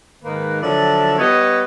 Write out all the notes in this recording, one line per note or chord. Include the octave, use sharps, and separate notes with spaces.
G#2 D#3 A#3 D#4 B4
D3 F3 F#3 D5 E5 A5
G3 B3 B4 C#5 D#5